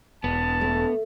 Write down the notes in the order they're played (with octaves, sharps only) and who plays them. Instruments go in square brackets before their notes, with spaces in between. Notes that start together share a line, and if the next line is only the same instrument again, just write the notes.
[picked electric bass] E1 [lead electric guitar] B3 [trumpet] A5
[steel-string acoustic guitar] A3